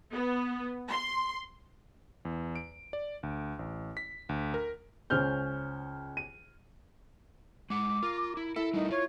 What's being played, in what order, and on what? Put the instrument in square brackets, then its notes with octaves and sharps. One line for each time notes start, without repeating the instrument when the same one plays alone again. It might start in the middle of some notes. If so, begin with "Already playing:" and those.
[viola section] B3
C6
[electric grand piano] E2
D7
D5
D2
A1
B6
D2
A#4
[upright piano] C#2 C#4 C5 F6 G6
D#7
[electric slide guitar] G#3 F#5 [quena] D6
[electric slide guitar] F4 [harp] A#4
[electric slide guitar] E4
[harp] E4 [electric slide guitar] A4
[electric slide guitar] G3 A3 A#4 [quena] D#4
[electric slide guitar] F4 [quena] C#5